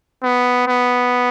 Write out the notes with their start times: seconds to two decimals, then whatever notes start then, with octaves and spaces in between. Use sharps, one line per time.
0.23 B3
0.68 B3